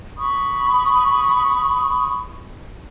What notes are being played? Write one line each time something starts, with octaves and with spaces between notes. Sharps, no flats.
B5 C#6 D#6